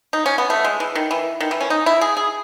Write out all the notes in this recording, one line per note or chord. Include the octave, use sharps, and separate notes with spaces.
D#4
C#4
B3
A3
G#3
E3
D#3
E3
D#3
E3
C#4
D#4
E4
G#4
G#4